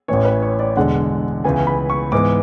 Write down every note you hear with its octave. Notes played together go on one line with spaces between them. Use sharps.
A1 A2 E3 C#5
B4
C#5
D5
E1 E2 D3 G#3 F#5
C#2 C#3 E3 B3 G#5
B5
C#6
G#2 E3 B3 D6